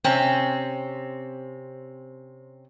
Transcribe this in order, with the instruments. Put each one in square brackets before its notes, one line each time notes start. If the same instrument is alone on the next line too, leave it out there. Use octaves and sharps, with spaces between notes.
[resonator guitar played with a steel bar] C3 C4 C#4